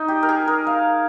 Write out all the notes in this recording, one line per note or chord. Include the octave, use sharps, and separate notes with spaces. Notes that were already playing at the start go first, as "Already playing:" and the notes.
Already playing: D#4
G4
A#4
G#4
A#4
F5